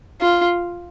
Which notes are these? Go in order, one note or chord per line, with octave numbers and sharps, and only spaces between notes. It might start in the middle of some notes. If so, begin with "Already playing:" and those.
F4